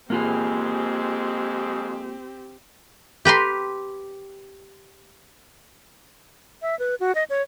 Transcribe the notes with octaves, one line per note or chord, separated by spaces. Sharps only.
F2 G#3 A#3 C4 F4 G4 G#4
G4 B4 A#5 C6
E5
B4
F#4
D#5
C#5